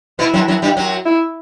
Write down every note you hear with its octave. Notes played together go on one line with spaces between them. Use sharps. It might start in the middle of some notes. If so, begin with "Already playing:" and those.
B2 B3 E4
F#2 F#3
F#2 F#3
G2 G3
F#2 F#3
E4